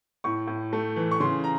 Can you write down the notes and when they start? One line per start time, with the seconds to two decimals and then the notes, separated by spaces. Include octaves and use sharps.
0.24 A2 C#6
0.47 A2
0.73 A3
0.96 E3
1.11 C#6
1.20 C#3 C6
1.44 A#5